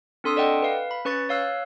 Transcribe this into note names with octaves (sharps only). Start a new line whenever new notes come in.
C4 D4 A4 C6 D#6 E6
A4 D5 D#5 F#5 G5
B4 F5
B5
C#4 B4 C#6 A6
C#5 F5 E6 F#6